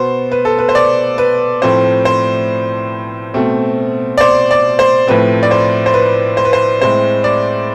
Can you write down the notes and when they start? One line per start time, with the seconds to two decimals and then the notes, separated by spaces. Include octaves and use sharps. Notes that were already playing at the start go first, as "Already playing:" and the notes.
Already playing: B2 B3 C5
0.32 B4
0.45 A4
0.59 B4
0.69 C5
0.75 D5
1.18 B4
1.62 A2 F3 A3 C4 C5
2.05 C5
3.34 B2 A3 C4
4.17 D5
4.21 C5
4.51 D5
4.79 C5
5.07 A2 F3 A3 C4 B4
5.43 D5
5.51 C5
5.86 C5
5.94 B4
6.37 C5
6.45 B4
6.53 C5
6.81 A2 G#3 C4 C5
7.24 D5